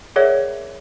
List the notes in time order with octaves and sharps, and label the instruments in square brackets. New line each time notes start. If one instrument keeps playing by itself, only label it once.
[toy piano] G#4 A#4 C#5 D5 E5 F#5